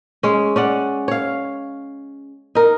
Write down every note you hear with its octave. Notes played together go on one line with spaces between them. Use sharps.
G#3 C#4
C#4 D5 F#5
C#5 F5
D#4 A#4